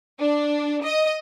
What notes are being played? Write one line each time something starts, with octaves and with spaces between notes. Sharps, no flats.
D4
D#5